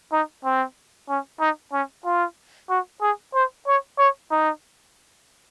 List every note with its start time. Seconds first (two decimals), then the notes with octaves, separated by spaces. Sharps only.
0.12 D#4
0.44 C4
1.09 C#4
1.40 D#4
1.72 C#4
2.05 F4
2.70 F#4
3.02 G#4
3.34 C5
3.67 C#5
3.99 C#5
4.31 D#4